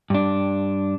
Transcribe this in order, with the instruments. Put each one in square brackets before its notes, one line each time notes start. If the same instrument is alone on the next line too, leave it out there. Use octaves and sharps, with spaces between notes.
[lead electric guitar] G2 D4